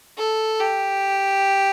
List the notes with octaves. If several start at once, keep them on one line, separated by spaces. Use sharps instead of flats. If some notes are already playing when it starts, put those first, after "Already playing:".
A4
G4